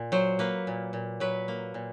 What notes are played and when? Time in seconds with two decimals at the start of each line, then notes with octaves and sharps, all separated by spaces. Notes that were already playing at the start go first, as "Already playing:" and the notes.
Already playing: A#2
0.12 F#3 C5
0.39 A#3 B4
0.67 A#2
0.93 A#2
1.20 F#3 B4
1.48 A#3
1.74 A#2